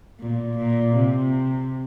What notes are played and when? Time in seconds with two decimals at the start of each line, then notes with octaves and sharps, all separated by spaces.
0.20 A#2
0.58 A#2
0.96 C3